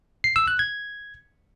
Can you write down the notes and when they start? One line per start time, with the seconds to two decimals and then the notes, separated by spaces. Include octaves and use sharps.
0.24 C7
0.36 E6
0.48 F#6
0.59 G#6